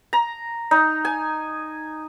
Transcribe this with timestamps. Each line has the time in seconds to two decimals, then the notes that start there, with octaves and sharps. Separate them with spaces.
0.13 A#5
0.71 D#4
1.05 G#5